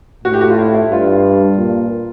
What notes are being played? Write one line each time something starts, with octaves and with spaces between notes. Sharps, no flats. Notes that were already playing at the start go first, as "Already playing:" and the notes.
A2 F#4
G4
F#4
F4
E4
E4
G2 F4
A#2